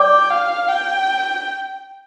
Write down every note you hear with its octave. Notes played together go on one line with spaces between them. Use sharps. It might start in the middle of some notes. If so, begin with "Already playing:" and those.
Already playing: D5 G5 D6
F5
G5